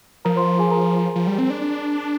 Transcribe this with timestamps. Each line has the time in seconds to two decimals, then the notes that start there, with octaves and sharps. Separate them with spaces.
0.25 F3 A#4 A#5
0.36 C5 C6
0.59 G#4 G#5
0.71 A#4 A#5
1.15 F3
1.27 G3
1.38 C4
1.50 D4
1.62 D4